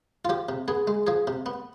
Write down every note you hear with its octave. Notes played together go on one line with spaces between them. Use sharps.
F4
F3 G4
C3
B3 G#4
G#3
F3 G#4
C3
B3